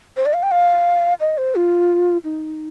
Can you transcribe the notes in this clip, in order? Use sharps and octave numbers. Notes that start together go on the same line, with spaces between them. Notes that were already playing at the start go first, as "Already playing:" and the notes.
C5
D5
F5
G5
F5
D#5
C5
F4
D#4